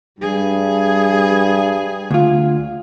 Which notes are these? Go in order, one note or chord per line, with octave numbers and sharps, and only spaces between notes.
G2 G3 G#4
D2 F4